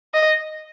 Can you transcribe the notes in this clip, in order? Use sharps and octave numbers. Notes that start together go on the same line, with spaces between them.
D#5